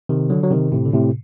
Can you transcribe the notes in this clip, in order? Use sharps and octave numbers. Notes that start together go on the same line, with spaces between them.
C3 D#3
D3 F#3
F#3
C3 D#3
A2 C3
D3
A2 C3